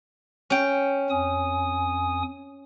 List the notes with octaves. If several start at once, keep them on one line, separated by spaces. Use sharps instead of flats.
C#4 G5
F2 G#5 D#6